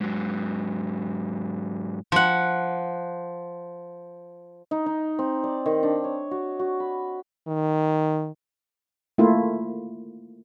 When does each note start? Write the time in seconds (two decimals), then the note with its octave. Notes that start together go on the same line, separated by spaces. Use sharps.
0.01 G#2 F#3
2.12 F3 F#5
4.71 D#4
4.86 D#4
5.19 C4
5.44 D5
5.66 D#3
5.83 D4
6.04 C#5
6.31 F#4
6.59 F#4
6.80 B5
7.47 D#3
9.18 A3 A#3 E4 F4